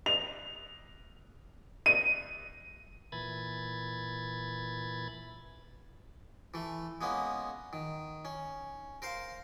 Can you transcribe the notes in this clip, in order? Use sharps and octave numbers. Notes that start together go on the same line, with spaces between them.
F7
D#7
A#2 E3 B5 G#6 A6
E3 A3
G#3 A#3 B3 C#4
D#3
C#4
A#4 C5 F5